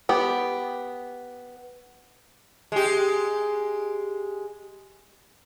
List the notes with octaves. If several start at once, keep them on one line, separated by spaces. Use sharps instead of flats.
B3 G4
G#3 G4